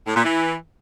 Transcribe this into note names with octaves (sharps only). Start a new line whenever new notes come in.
A2
A#2
E3